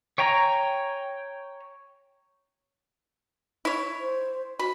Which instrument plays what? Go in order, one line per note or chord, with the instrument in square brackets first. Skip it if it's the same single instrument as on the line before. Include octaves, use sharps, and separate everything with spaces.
[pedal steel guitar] C#5 G5 G#5 A#5
[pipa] E4 C#5
[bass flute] C5
[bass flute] F#4 [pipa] B5